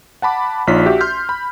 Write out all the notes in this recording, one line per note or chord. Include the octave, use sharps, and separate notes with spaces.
F#5 A5 B5 D6
A#1 D#4 F4 C#5 B6
F#4 G4 E5
C6 F6 G6
B5